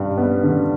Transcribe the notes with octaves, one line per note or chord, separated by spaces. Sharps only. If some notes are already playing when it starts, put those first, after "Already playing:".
Already playing: G2 G3
B3
D3